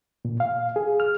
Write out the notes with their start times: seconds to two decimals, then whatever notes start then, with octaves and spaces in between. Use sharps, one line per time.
0.25 A#2
0.40 F5
0.76 G#4
1.00 F6